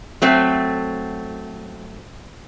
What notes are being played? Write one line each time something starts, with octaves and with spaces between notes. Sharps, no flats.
F#3 A3 C4